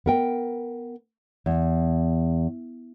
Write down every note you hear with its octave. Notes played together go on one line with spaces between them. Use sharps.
B3 A#4 G5
E2